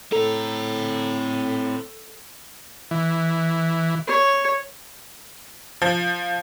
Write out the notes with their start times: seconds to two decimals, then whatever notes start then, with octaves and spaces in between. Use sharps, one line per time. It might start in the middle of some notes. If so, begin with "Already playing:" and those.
0.12 A2 C4 A4 A#5
2.91 E3
4.07 C#5
5.82 F3